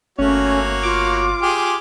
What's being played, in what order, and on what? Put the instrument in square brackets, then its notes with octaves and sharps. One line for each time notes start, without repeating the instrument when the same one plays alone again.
[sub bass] G1 [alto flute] A3 [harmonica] A#3 F#4 C#5 [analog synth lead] C#4
[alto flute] F4 [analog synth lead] D6
[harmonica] G4 G#4